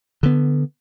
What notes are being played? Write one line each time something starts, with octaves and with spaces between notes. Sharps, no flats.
D3 B3